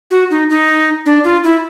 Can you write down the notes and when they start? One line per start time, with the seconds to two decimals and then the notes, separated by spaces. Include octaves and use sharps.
0.11 F#4
0.30 D#4
0.50 D#4
1.06 D4
1.24 F4
1.44 E4